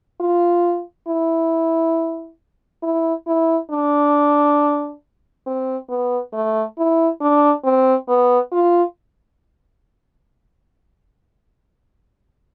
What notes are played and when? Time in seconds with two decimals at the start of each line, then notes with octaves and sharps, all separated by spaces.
0.20 F4
1.08 E4
2.83 E4
3.27 E4
3.71 D4
5.46 C4
5.89 B3
6.33 A3
6.78 E4
7.21 D4
7.64 C4
8.08 B3
8.52 F4